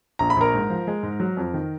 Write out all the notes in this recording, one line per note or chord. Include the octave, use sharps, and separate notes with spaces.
A#1 A#5
B5
A#1 A#4 A#5
G#2
F3
G#3
G#2
F#3
F2
D#3